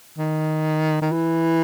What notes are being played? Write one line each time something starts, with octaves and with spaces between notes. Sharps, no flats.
D#3
D#3
E3